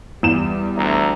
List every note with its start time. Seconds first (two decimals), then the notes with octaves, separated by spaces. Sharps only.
0.23 E2 G3 E7
0.77 D2 E5 A#5